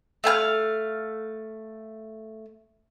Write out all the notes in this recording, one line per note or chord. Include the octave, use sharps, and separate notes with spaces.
A3 F5 G#5 F6